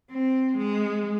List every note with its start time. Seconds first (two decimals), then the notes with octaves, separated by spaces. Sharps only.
0.11 C4
0.57 G#3